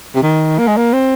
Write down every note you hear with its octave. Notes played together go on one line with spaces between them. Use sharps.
C3
D#3
A#3
G#3
A#3
C4